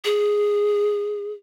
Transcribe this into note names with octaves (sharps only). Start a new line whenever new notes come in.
G#4